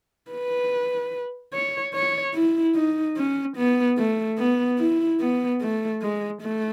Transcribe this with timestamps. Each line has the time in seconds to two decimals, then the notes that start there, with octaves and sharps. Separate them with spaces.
0.31 B4
1.53 C#5
1.94 C#5
2.35 E4
2.75 D#4
3.17 C#4
3.57 B3
3.98 A3
4.38 B3
4.79 E4
5.20 B3
5.61 A3
6.02 G#3
6.42 A3